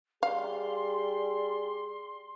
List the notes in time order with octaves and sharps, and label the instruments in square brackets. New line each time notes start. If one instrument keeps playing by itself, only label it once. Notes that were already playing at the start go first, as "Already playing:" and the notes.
[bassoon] G3 [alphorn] G#4 [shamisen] F5 [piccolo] C6